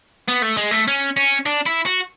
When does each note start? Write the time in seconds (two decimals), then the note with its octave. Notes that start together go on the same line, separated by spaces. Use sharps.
0.28 B3
0.42 A3
0.57 G#3
0.71 A3
0.88 C#4
1.17 C#4
1.46 D4
1.66 E4
1.86 F#4